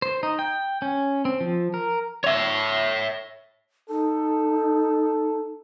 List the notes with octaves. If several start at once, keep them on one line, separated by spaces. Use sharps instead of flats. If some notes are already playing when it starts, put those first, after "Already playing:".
C5
D#4
G5
C#4
C4
F3
A#4
C#5 E5
D#4 A4